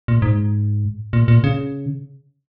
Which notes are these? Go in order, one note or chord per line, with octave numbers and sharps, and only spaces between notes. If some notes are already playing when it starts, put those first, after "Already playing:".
A#2
G#2
A#2
A#2
C#3